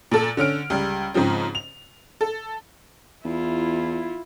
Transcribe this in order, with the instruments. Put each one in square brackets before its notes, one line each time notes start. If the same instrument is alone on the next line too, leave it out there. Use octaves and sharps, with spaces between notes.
[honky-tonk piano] A#2 A4
D3 C#4 F6 D7
C#2 G3
G#2 C#3 F3 C4
F7
A4
[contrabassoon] E2 [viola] E4 F4